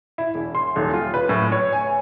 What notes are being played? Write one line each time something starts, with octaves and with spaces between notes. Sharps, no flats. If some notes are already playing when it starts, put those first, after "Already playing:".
E4
E1
C6
D#1
F4
B4
A2
C#5
G#5